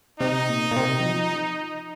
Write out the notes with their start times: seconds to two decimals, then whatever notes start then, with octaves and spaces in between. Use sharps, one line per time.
0.20 C3 D#4
0.48 A#2
0.71 A#2
0.76 C3
1.00 F#3
1.05 F3